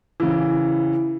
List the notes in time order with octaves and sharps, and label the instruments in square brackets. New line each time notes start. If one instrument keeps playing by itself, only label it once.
[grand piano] C#3 E3